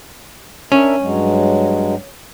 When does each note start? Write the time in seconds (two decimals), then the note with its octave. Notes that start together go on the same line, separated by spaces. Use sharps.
0.72 C#4 D4 A#4 E5
1.00 G2 F#3 G#3